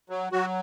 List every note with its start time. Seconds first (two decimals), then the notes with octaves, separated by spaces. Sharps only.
0.10 F#3
0.32 F#3 F#4